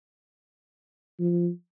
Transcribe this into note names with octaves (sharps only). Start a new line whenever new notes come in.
F3